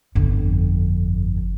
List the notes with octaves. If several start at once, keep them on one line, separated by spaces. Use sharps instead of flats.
G1 F2